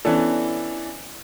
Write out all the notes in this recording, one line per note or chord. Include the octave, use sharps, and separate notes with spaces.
E3 B3 C#4 D4 A4